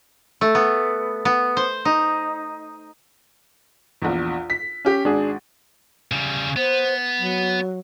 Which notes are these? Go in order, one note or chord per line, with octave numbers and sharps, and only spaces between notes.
A3
B3
B3
C5
D#4
A#1 E2
B6
C#4 G4
G#1 D4 G#4
C#3 G3
B3 C5
F#3